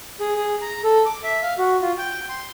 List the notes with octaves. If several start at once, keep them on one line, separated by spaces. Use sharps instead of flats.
G#4
G#4
A#5
A4
D6
E5
F5
F#4
F4
G5
C6